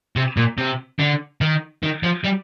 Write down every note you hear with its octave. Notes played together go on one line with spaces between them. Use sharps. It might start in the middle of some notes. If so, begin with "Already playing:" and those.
C3
A#2
C3
D3
D#3
D#3
F3
G3